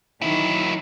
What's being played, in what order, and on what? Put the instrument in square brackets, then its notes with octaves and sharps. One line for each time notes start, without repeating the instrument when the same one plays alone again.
[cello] D#3 E3 [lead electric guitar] F#3 E4